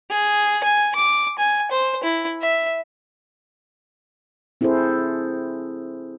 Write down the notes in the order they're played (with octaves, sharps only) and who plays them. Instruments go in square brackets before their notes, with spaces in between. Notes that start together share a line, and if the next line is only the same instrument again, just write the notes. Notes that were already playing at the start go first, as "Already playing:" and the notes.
[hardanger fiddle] G#4
G#5
D6
G#5
C5
E4
E5
[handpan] C4 E4 G#4 A4 C5